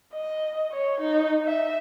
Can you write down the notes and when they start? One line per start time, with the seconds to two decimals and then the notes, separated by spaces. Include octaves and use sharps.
0.14 D#5
0.72 C#5
1.01 D#4
1.45 E5